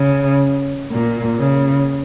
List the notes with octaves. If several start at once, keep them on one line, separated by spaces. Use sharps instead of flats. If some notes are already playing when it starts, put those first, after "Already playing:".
Already playing: C#3
A#2
C#3